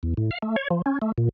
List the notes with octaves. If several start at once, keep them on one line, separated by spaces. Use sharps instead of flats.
E2
A2
F5
A3
C#5
F3
C#4
A3
A#2